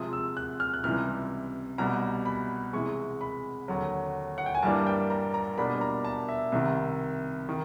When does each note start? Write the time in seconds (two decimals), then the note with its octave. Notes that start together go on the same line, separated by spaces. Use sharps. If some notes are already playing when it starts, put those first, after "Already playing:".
Already playing: C3 F3 G#3 D#6
0.13 E6
0.37 F#6
0.60 F6
0.74 F#6
0.84 C#2 C3 E3 G3 F6
1.78 C2 B2 G3 A#5
2.26 B5
2.73 C3 E3 G#3 C#6
3.21 B5
3.68 D#2 D3 F#3
4.38 F#5
4.46 G5
4.55 G#5
4.63 G2 E3 G3 A#3 D4 A5
4.87 G5
5.10 A#5
5.34 A#5
5.57 B2 G3 A#3 D4 B5
5.81 A#5
6.05 A5
6.29 E5
6.52 C2 C3 D#3
7.49 D#3